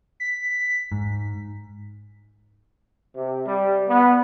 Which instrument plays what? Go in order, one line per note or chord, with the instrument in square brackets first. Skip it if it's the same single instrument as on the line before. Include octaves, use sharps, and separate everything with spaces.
[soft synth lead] B6
[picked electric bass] G#2
[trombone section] C3
G3
B3